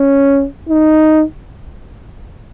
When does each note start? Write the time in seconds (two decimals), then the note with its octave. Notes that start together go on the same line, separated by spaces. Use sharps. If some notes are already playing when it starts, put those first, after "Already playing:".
Already playing: C#4
0.69 D#4